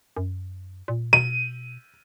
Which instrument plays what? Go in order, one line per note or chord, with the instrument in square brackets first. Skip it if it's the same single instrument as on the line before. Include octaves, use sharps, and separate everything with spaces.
[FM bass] F#2
A#2
[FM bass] B2 [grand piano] D#7